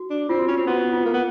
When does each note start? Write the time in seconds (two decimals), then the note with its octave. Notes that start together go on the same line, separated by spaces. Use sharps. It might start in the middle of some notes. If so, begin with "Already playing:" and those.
Already playing: F#4
0.10 D4
0.29 C4 F4
0.39 F#4
0.48 C#4 F4
0.57 C4
0.67 B3 F#4
0.93 F4
1.06 A#3
1.14 B3